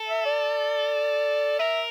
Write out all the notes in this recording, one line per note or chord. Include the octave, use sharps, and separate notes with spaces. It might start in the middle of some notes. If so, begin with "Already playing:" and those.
Already playing: A4
E5
D5
A#4 E5